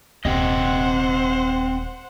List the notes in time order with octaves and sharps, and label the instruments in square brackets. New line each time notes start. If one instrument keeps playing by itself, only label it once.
[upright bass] D#1 D#3 [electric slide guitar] C4 G4 D#5 [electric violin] C5 F#5